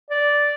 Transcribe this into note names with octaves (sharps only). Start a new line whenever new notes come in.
D5